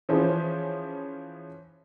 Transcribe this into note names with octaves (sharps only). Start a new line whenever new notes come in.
E3 F3 C#4 G#4 C5